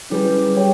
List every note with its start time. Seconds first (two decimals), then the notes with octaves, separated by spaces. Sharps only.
0.10 G3 C#4 E4 G#4 B4
0.55 G4 C#5 G5